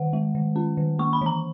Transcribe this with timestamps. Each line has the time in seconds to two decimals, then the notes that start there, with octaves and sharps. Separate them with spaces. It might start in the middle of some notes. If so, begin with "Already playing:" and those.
Already playing: D#3 F#5
0.13 G#3
0.35 D#3
0.56 C#4
0.77 D#3
0.99 A#3 C#6
1.13 B5
1.21 E3 A#5